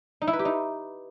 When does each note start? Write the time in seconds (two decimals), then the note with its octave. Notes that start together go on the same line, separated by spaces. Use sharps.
0.22 D#4
0.27 E4
0.33 B4
0.39 G4
0.45 D#4